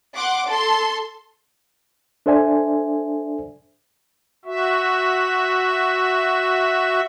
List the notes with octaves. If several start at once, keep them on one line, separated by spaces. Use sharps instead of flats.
F#5 C6 D6
A4 C6
D4 A4 C5 D5 E5 G#5
F#4 E5